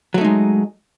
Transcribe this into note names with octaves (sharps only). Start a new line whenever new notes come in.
F#3 G#3 A3 D#4